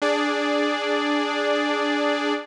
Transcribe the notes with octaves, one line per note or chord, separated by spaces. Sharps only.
D4 G#4 D5